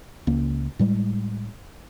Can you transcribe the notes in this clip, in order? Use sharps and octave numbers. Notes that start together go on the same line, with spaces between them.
C#2 A#3
A2 G3 G#3